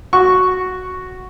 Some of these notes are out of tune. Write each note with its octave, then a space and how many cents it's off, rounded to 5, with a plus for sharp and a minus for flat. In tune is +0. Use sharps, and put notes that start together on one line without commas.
F#4 +0 C#6 +0